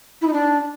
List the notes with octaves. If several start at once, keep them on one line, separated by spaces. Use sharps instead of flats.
E4
D#4
D4